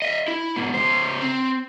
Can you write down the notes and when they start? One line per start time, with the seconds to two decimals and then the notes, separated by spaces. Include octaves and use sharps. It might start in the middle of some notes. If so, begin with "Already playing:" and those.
0.02 D#5 E5
0.28 E4
0.56 G#2 B2
0.74 C#3 C5
1.21 C4